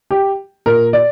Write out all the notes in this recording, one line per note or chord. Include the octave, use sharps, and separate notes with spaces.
G4
A#2 A#4
D5